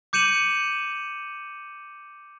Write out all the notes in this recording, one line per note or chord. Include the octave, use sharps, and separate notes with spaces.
D6 G6 C#7 D#7 E7 F#7